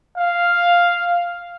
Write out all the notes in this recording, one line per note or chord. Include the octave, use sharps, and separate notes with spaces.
F5